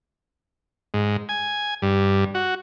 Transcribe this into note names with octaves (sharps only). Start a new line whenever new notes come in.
G#2
G#5
G2
F#4